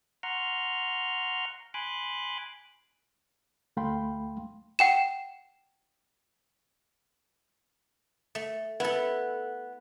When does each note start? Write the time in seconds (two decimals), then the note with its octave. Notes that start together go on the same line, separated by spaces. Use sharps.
0.23 F#5 A#5 C6 C#6 F6
1.74 G#5 B5 C6 D6 F#6
3.77 D2 A3 F5 G5 B5 C6
4.79 F#5 G5 E7
8.35 A3
8.80 B3 E4 A4